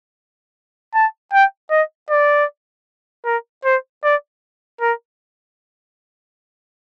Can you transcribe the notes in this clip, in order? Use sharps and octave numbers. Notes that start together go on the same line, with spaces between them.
A5
G5
D#5
D5
A#4
C5
D5
A#4